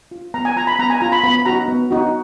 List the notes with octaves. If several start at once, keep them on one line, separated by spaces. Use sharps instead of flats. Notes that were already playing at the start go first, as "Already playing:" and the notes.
F4
B3 A#5
G#5
F4 A#5
B5
B3 A#5
G#5
F4 A#5
B5
B3 B5
D#4 F#4 A#5
B3
D#4 F#4